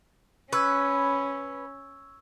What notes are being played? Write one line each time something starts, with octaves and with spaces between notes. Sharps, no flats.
C#4 B4 C#6 E6 G#6